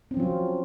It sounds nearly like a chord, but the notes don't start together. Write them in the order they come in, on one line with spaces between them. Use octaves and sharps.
C4 C#4 F3 F4 F#3